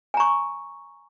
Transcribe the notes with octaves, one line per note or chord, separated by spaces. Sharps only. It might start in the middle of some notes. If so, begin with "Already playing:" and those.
G#5 A#5 C#6